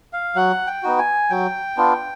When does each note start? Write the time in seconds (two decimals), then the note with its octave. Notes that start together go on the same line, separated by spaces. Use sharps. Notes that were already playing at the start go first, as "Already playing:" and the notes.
0.13 F5
0.36 F#3 F#5
0.67 G5
0.83 B3 D#4 F#4
0.99 G#5
1.30 F#3 G5
1.77 B3 D4 F4